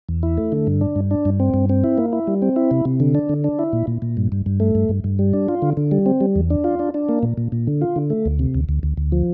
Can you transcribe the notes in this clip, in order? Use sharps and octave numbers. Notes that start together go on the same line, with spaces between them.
E2
E4
A3
D3
G2
D4
G2
D4
G2
C4
G2
C4
E4
A#3
E4
G3
C4
E4
C3
C3
D3
D4
D3
D4
E4
A#2
A#2
A#2
G2
G2
G2
A3
G2
G2
G2
G3
D4
F4
D3
D3
G3
C4
G3
E2
D4
F4
D4
D4
A#3
A#2
A#2
A#2
D3
F4
D3
A3
D2
C3
D2
D2
D2
D2
F3